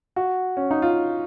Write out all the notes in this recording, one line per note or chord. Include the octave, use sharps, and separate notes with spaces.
F#4
C#4
D#4
F4